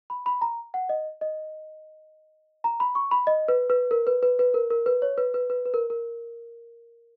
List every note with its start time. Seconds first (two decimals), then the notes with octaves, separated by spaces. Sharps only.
0.10 B5
0.26 B5
0.41 A#5
0.74 F#5
0.89 D#5
1.21 D#5
2.64 A#5
2.80 B5
2.95 C#6
3.11 B5
3.27 D#5
3.48 B4
3.70 B4
3.91 A#4
4.07 B4
4.23 B4
4.39 B4
4.54 A#4
4.70 A#4
4.86 B4
5.02 C#5
5.18 B4
5.34 B4
5.50 B4
5.65 B4
5.74 A#4
5.90 A#4